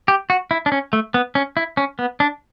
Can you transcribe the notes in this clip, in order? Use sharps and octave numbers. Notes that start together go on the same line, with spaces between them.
G4
F#4
E4
D4
C#4
A3
B3
C#4
E4
C#4
B3
D4